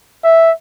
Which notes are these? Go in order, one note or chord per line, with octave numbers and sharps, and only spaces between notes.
E5